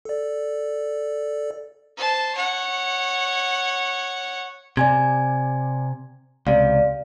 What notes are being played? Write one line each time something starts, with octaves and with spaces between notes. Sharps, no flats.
A4 D5
C5 A5
C#5 F#5
C3 D5 G#5 G#6
C#2 C3 D5 F5